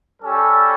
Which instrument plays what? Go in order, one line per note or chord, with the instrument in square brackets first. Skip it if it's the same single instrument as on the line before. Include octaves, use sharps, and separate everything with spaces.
[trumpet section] G3 C#4 G4 A4